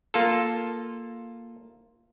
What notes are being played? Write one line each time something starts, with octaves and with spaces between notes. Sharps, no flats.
A#3 F4 A4